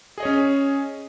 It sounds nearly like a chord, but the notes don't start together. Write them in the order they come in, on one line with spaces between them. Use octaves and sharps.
G#4 D#5 C#5 C#4